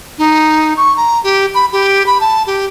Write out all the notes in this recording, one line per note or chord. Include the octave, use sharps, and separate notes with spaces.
D#4
C#6
A#5
G4
B5
G4
B5
A5
G4